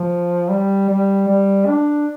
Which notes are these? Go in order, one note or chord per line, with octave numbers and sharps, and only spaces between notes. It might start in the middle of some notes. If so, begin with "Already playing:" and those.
Already playing: F3
G3
G3
G3
D4